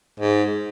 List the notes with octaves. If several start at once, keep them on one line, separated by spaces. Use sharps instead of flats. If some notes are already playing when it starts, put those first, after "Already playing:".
G#2